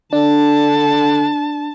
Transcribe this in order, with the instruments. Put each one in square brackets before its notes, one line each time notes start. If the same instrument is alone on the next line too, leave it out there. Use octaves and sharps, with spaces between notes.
[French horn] D3 [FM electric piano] D4 [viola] A5